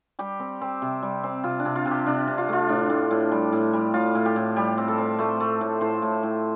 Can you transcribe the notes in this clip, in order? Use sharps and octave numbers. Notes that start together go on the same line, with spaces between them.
G3 G4
C4
C4
C3
G3
C4
C3 F4
D4
C3
F4
C3
G4
C3 D4
C3
F4
A3 F4
A2 D4
A2
A2
G3
A2
G3
A2 F4
A2
G4
A2
G3 G4
C4
A4
C4
A3 C5
A3
A2
A2 C5
A2
A2